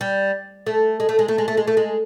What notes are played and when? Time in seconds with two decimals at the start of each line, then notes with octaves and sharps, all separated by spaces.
0.01 G3
0.66 A3
1.00 G#3
1.09 A3
1.19 G#3
1.28 A3
1.38 G#3
1.48 A3
1.57 G#3
1.67 A3
1.77 G#3